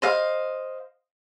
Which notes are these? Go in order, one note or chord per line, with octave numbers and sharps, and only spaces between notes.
C5 D#5 F5